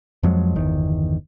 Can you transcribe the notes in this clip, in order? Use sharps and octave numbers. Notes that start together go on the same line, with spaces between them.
F2 F3 F#3 G#3
G1 E2 D#3